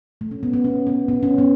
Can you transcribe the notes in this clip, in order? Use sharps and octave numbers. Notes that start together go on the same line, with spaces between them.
A3
C#4
B3
B3
C#4
B3
B3
C#4
B3